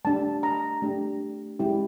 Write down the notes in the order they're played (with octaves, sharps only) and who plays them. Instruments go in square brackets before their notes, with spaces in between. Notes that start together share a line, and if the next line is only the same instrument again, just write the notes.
[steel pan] A3 D4 G4 A5
A#5
A3 D4 G4
G#3 C#4 E4 G4